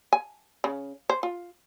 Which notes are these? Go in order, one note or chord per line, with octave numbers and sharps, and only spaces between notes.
G#5
C#3
C5
F4